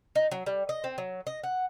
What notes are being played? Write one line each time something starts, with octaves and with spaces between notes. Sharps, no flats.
D#4
F#3
G3
D#5
C4
F#3
D#5
F#5